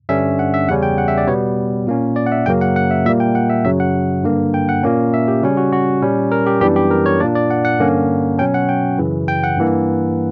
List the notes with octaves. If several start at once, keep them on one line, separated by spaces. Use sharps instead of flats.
G2 D3 G3 C#4 E5
F#5
E5
E2 C#3 G3 C#4 F#5
G5
F#5
E5
D5
B2 G3 B3 C#5
A#2 A#3 C#4
D5
F#5
E5
F#2 C#3 F#3 A#3 G5
F#5
F#5
E5
A#2 G3 A#3 E5
G5
F#5
E5
F#2 C#3 F#3 E5
F#5
G2 D3 A#3
G5
F#5
A#2 A#3 C#4
E5
G4
C#3 G3 C#4 F#4
F#4
F#4
A#2 G3 C#4
A#4
G4
F#2 E3 G3 B3 D4 G4
G4
A#4
C#5
A#2 A#3 D4 D5
D5
F#5
F#5
G2 D3 A#3 C#4
B2 F#3 C#4 G5
F#5
G5
F#2 C#3 E3
G5
F#5
G2 E3 A#3